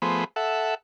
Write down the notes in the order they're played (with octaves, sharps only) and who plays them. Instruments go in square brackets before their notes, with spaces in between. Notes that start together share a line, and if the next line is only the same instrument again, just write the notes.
[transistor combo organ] F3 A3 B3 G#4 C5 B5
A4 E5 F#5